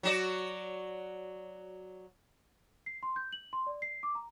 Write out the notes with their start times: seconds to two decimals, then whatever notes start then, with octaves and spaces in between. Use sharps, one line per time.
0.03 F#3 F#4 D5
2.86 C7
3.03 C6
3.16 G6
3.32 F#7
3.53 C6
3.67 D5
3.82 C7
4.03 D6
4.15 A#5